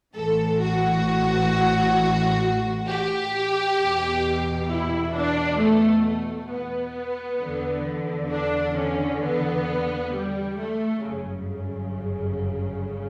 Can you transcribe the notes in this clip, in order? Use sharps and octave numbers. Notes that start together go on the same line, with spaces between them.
A1 A2 E3 A4
F#4
G4
E2 B2
E4
D4
A3
A3
B3
E2 D3
D4
C#4
B3
G3
A3
G1 F#2 C#3